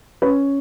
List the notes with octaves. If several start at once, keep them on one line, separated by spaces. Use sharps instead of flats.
C#4 B4